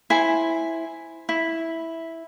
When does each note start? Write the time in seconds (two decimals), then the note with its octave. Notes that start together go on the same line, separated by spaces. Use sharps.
0.10 E4 C5 G#5
1.29 E4